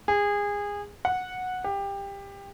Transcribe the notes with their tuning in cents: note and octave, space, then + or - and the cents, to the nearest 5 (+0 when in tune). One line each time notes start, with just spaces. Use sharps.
G#4 -25
F#5 -10
G4 +20